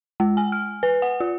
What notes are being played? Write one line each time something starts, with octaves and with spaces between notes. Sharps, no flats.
G#3
G#5
F6
B4
F#5
F4